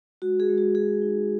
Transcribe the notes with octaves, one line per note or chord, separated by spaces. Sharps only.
G#3 F#4
G#4
G#3
F#4
F#4 G#4
D#4